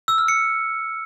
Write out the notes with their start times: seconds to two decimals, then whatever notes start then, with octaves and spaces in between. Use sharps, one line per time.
0.08 E6
0.18 F6
0.28 C#7